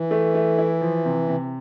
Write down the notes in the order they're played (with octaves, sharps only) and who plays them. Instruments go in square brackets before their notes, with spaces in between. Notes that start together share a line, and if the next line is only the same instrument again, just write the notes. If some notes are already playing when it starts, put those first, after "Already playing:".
Already playing: [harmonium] E3
[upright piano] A3
A3
E4
F3
C3
C3